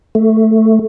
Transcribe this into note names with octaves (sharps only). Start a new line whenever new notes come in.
A3